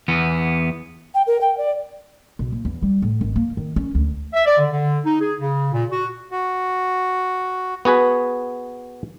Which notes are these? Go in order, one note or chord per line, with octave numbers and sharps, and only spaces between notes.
E2 B3
G5
A#4
G5
D5
B1
A#2
E2
G3
A2
G#1
A#3
D#3
C#4
D2
E5
D5
D3
D3
D#4
G#4
C#3
A#2
F#4
F#4
B3 F#4 G#4 B4